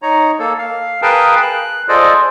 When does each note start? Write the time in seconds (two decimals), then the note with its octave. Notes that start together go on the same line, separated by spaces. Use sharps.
0.02 D#4 C#5 A#5
0.39 A#3 A4
0.58 F5
1.02 G#4 A#4 B4 F5 G5 A5
1.42 F#6
1.88 F4 G#4 A4 C5 D5 D#5